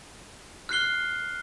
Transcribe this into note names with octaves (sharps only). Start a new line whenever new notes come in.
F6 F#6 C7 G7